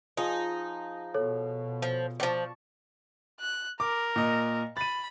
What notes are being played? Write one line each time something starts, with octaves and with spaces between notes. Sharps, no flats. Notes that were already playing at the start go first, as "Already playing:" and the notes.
F3 D#4 G#4 G#5
B2 A4 C#5
F3
D#3 F3 D5 A5 C#6
F#6
A#4 D6
A#2 D#5
B5 A6 D#7